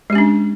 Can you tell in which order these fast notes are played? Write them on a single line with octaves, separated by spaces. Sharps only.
G#3 G4 C#4 D4